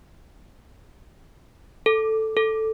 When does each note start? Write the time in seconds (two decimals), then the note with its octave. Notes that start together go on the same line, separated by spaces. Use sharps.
1.86 A4
2.37 A4